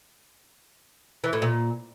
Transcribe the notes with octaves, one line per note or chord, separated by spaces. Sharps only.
E3
A2
A#2